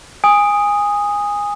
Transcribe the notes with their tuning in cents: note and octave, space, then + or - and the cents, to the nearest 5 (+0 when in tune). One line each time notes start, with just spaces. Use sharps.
G#5 -20 D#6 +0